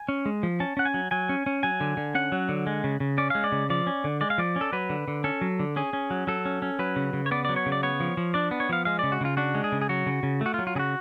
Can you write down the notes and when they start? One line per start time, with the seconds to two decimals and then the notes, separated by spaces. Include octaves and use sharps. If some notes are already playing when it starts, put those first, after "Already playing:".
Already playing: G#5
0.09 C#4
0.26 G#3
0.43 F3
0.60 C#4 A5
0.77 C#4 F#5
0.85 G#5
0.94 F#3
1.11 F#3 G#5
1.29 C#4
1.46 C#4
1.63 F#3 G#5
1.80 D3
1.97 D3
2.15 C#4 F#5
2.32 F#3
2.49 D3
2.67 G#3
2.84 C#3
3.00 C#3
3.18 C#4 D5
3.30 G#3 F5
3.44 D5
3.52 C#3
3.70 F3 D5
3.87 C#4
4.04 D3
4.21 G#3 D5
4.30 F5
4.38 F3 D5
4.56 C#4
4.61 A4
4.73 F#3 B4
4.90 D3
5.08 D3
5.24 C#4 A4
5.41 F#3
5.59 D3
5.76 C#4 G#4
5.93 C#4
6.10 F#3
6.27 F#3 A4
6.45 C#4
6.62 C#4
6.79 F#3 B4
6.96 C#3
7.13 C#3
7.26 C#5
7.31 B3 D5
7.45 F#3 D5
7.56 C#5
7.66 C#3
7.72 D5
7.83 B3 C#5
8.00 F3
8.17 F3
8.34 D4 D5
8.51 B3
8.60 C#5
8.69 F3 F5
8.85 G#3 F5
8.99 C#3 D5
9.12 F#4
9.21 C#3 F4
9.37 D4 F#4
9.55 G#3
9.64 G#4
9.72 C#3
9.81 G#4
9.89 F#3 F#4
10.07 C#3
10.23 C#3
10.41 A3 F#4
10.54 F4
10.59 F#3
10.67 F4
10.75 C#3 G#4
10.79 F#4